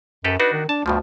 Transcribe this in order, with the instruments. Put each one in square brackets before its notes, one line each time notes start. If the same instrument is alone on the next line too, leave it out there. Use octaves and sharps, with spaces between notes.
[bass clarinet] F#2 [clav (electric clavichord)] G4 A4 B4
[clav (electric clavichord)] D4 D#4 F#4 [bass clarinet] B4
[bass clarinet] D#3
[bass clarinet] D4 [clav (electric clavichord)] A5
[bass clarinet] D2 [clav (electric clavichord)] G2 B2 F3